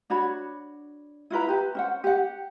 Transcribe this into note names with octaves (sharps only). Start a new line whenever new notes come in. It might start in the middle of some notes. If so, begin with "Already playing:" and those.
D4 F#4 C#5 B5
E4 F4 B4 A#5
G4 B4
C#4 C5 F#5
G4 F#5